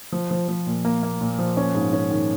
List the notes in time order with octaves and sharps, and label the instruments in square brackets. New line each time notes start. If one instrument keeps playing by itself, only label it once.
[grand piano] F3
F3
F3
A#2
A#3
A#3
A#2
F3
C#4
G#2
C#4
D#3